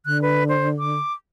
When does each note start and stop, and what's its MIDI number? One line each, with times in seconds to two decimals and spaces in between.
0.06 0.99 50
0.06 0.20 90
0.22 0.44 71
0.49 0.69 72
0.79 1.13 86